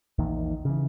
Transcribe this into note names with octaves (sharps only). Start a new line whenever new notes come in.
A#1 E2 A#2 D#3
C#3 E3